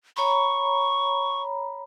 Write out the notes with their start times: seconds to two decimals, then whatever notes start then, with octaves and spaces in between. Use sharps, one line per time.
0.17 C#5 A#5 B5 C#6